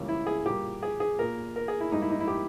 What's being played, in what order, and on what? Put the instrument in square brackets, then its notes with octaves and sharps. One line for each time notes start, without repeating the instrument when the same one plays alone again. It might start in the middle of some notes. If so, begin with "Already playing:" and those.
Already playing: [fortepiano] C#2 C#3 E3 G3 A#3
E4
G#4
A#2 G3 A#3 G4
G#4
G#4
A#2 A#3 A#4
A#4
G#4
E4
G#2 G3 A#3 D#4
E4
D#4
E4
G4